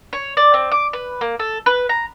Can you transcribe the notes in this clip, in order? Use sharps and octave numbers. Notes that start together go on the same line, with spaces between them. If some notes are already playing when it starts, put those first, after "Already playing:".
C#5
D5
C4
D6
B4
A#3
A4
B4
A#5